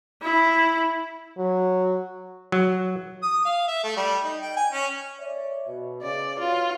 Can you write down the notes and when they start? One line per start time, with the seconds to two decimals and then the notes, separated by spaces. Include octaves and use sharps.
0.22 E4
1.38 F#3
2.52 F#3
3.23 D#6
3.45 F5
3.67 E5
3.83 A3
3.97 G3
4.24 D#4
4.41 G5
4.56 G#5
4.73 C#4
5.19 C#5 D5 E5
5.67 B2
6.02 C#3 D5
6.39 F4 F#4 B4 C#5